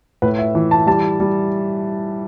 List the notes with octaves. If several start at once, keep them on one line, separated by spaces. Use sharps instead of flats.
A2 B4
E5
E3
A5
G3 A5
G3